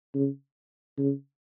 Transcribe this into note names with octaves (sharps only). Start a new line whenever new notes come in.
C#3
C#3